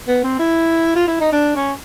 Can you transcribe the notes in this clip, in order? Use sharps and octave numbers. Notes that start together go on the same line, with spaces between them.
B3
C4
E4
F4
E4
D#4
D4
C#4